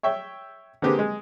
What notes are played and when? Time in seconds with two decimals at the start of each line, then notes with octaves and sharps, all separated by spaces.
0.03 C#5 E5 G5
0.82 D3 A#3 C4 G4 G#4 B4
0.99 G#3